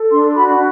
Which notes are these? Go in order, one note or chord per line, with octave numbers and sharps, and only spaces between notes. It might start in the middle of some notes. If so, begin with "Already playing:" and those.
Already playing: A4
D4 C6
F#4 B5